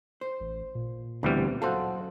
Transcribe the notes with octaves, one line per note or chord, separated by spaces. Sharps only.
C5
A1
A#2
D2 B2 E3 G3 C4
F#2 F#4 A4 C5 F5 F#5